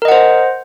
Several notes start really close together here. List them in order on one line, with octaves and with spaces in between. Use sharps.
A#4 D#5 F#5 C5